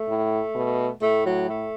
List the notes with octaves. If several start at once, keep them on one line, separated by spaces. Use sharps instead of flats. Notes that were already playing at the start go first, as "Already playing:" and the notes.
Already playing: A3
A2
B2
A2 A3
F#3
A3